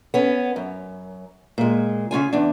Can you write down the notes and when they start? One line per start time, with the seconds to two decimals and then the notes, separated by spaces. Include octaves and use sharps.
0.14 B3 C#4
0.56 F#2
1.58 A#2 G#3
2.11 C#3 C#4 F4 G#5
2.33 E2 D4